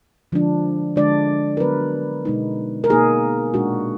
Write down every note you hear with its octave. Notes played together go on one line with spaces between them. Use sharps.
D3 F3 G#3 D4
D3 G#3 D4 D5
A#4
D3 F#3 B3 B4
B2 G#3 D#4
A#4
B2 A#3 D#4 G#4
A#2 G#3 D4 F#4